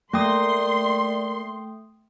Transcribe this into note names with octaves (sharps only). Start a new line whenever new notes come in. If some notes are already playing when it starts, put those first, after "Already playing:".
A3 A#3 D5 G5 C6 D#6